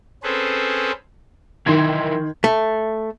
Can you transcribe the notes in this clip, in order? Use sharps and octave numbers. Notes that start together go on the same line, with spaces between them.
C4 C#4 G#4 A4 B4 C5
D#3 E3 D#4 E4 C6 G#6
A3